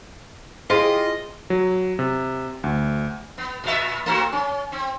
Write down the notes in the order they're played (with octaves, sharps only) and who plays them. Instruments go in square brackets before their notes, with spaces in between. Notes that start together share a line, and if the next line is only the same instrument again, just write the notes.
[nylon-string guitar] E4 G#4 C5 [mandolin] F4 G4 C6 [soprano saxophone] D#5
[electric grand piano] F#3
C3
D2
[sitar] B3
A#2 B3 E5
A3 C4 F#4
C#4
C4